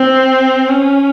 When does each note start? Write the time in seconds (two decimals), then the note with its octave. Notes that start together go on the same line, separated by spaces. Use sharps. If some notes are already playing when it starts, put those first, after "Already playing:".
Already playing: C4
0.68 C#4